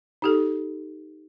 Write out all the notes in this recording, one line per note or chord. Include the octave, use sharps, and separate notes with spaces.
D#4 G4 A4